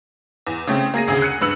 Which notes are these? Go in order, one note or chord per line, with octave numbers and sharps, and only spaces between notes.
E2
C#3 A3 C4
A#3 G#4 A#6 D#7
D2 C#3 G#4
F#6 C#7 D#7
G2 B4 E6 C#7 F#7